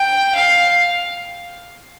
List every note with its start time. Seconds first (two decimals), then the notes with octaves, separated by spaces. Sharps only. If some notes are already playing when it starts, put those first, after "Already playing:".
Already playing: G5
0.35 F5